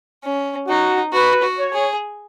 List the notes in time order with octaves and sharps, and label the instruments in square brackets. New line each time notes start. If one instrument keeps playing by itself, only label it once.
[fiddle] C#4
[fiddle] D#4 [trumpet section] F#4
[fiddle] F#4 [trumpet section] B4
[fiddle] F#4
[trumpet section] C#5
[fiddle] G#4